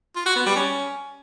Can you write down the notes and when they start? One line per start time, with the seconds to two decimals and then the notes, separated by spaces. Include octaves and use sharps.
0.16 F4
0.26 F#4
0.36 B3
0.46 G3
0.56 C#4